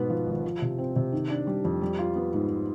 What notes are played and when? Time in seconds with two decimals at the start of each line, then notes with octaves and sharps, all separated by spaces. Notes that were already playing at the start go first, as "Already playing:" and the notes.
Already playing: G#2 B2 B3
0.10 F3
0.27 G#1
0.44 F3
0.62 C3
0.79 C4
0.96 C3
1.12 D#3
1.30 D4
1.47 G3
1.65 F2
1.81 G3
1.99 F4
2.16 B3
2.34 G#2